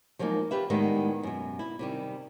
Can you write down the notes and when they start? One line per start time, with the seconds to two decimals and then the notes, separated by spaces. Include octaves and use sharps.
0.19 F3 F#3 G#3 A#3 D#4
0.51 F4 G4 B4 E5
0.70 A2 D#3 G3 G#3 B3
1.23 F#2 B2
1.59 E4
1.79 C3 D#3 G3